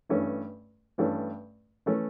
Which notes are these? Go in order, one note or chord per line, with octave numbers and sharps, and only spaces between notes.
G2 E3 A3 C#4
G2 E3 A3 C#4
E3 A3 C#4